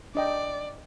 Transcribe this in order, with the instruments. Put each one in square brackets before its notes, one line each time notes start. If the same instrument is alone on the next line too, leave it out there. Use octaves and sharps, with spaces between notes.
[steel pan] D4 D#5 G5 [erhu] D5